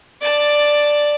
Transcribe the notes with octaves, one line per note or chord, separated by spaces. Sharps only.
D5 A5